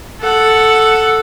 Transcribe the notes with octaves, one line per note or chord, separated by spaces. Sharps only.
A4 F#5